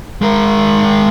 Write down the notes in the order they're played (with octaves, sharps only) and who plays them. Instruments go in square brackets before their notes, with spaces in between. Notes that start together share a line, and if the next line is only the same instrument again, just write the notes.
[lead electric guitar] G#3 A#4